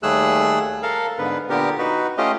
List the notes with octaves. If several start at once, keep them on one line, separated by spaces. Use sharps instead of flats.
D#2 G3 A3 G#4 E6 F#6
A4 A#4 F5
G#2 D3 B3 B4
A#2 D3 B3 G4 A#4
D#4 F#4 B4
A3 C#4 F4 G4 D#5